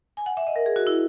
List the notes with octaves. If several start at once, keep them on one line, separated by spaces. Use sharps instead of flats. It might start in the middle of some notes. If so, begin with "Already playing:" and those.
G#5
F#5
E5
D#5
A#4
G#4
F#4
E4